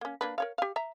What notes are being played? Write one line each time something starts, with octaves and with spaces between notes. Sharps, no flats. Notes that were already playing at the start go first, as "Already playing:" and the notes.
A#3 C#4
A#3 D4 B4
A#4 C#5 F5
G4 F5
E5 A#5